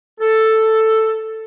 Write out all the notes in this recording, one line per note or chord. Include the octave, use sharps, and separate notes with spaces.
A4